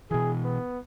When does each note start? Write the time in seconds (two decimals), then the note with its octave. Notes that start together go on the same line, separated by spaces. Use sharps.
0.11 B2 E3 G#4
0.44 B3